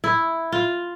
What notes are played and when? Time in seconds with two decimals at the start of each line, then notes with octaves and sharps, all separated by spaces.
0.04 E4
0.52 F4